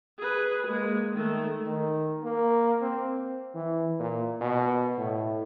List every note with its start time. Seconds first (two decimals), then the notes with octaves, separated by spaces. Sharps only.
0.18 G#4 B4
0.67 G#3 A#3
1.13 D#3 A3
1.66 D#3
2.23 A#3
2.81 C4
3.55 E3
3.99 A#2
4.41 B2
4.98 A2